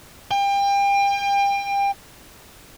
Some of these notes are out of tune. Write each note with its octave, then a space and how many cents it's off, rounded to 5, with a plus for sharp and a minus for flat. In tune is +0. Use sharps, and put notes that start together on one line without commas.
G5 +35